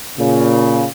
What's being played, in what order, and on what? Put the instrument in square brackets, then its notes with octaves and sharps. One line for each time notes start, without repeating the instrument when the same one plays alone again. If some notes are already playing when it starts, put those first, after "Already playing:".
[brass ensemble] A#2 C#3